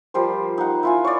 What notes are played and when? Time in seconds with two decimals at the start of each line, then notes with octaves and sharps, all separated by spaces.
0.14 F3 G3 A#3 C5
0.58 D#4 F#5
0.83 E4 F4 G#5
1.04 C#5 D5